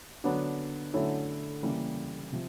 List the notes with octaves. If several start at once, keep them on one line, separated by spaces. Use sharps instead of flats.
D3 F#3 B3 D4
D3 F#3 A3 C#4 E4
C#3 E3 G3 A#3
C3 F3